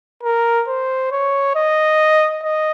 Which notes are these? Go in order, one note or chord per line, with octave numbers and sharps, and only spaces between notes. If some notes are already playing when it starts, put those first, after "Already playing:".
A#4
C5
C#5
D#5
D#5